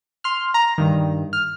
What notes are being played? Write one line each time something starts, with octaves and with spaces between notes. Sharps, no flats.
C6 F6
A#5
G2 D#3
F6